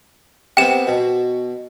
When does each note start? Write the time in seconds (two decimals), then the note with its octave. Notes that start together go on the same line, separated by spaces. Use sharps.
0.57 C3 B3 G5 E7
0.87 B2